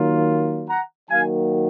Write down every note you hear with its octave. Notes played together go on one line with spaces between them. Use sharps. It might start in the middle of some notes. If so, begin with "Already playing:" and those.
Already playing: D#3 F#3 A#3 F4
F#5 A#5
D#3 F#3 A#3 F5 G#5